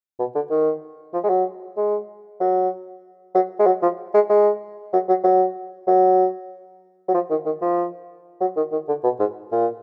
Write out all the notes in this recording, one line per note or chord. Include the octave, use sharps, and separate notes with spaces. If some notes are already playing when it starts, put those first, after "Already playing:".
B2
D3
D#3
F3
G#3
F#3
G#3
F#3
F#3
G#3
F#3
F3
G#3
G#3
F#3
F#3
F#3
F#3
F#3
F3
D#3
D#3
F3
F#3
D#3
D#3
D3
B2
G#2
A#2